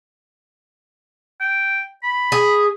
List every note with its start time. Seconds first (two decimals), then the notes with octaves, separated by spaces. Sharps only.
1.40 G5
2.03 B5
2.32 G#4